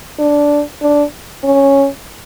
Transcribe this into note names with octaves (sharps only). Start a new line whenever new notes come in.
D4
D4
C#4